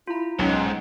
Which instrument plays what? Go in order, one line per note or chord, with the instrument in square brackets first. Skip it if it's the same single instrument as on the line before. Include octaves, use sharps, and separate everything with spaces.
[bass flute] E4 [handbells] F4 A#5
[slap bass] B1 [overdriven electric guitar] G#2 [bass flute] C#4 [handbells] D#4 F#5 G5